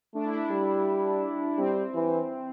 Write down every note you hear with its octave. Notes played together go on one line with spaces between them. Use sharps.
A3 D4
E4
D4
G3
G3 C4
E3